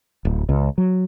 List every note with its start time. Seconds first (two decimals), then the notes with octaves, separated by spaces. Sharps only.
0.25 D1
0.49 C#2
0.78 F#3